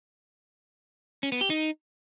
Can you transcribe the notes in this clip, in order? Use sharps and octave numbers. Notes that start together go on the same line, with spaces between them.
C#4
B3
G4
D#4